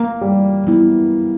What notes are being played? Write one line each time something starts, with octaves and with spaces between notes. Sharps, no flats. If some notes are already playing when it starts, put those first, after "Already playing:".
Already playing: A#3
G3
F#3 B3 E4